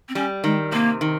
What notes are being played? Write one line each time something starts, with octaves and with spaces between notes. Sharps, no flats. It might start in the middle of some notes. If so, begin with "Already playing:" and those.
C4
G3 C#4
D#3 G#3
C3 A#3
D#3